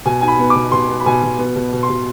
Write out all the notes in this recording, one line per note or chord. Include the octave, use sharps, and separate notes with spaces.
B2 G#5
D#4 G#5
B5
B3
B2 D6
B2 C6
B3
B5
B2 G#5
B2
B3
B2
B2
C6
B2